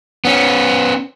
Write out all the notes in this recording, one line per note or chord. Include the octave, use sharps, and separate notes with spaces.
B3 C#4